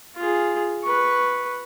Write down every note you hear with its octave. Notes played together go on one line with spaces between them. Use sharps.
F4 G#4
B4 C#6